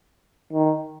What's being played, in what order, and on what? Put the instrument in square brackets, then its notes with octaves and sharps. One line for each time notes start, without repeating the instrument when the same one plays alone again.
[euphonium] D#3